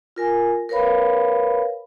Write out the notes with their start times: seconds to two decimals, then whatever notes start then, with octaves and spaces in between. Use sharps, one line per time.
0.16 F4 A#4 G#5
0.69 A#4 B4 C#5 F5 B5